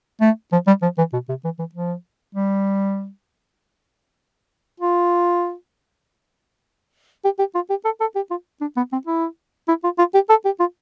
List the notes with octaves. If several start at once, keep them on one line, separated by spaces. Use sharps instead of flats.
A3
F3
G3
F3
E3
B2
C3
E3
E3
F3
G3
F4
G4
G4
F4
G4
A4
A4
G4
F4
D4
B3
C4
E4
E4
F4
F4
G4
A4
G4
F4